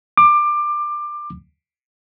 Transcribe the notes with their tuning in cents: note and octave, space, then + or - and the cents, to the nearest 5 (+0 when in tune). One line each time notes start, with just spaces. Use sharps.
D6 +20